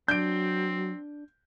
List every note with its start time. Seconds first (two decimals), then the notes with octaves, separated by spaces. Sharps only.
0.08 F#3 C4 D4 G6 D7